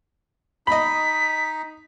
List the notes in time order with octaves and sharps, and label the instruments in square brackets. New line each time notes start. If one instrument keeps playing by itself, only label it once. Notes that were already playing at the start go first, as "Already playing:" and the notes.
[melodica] D#4 [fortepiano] D#5 B5 [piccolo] B6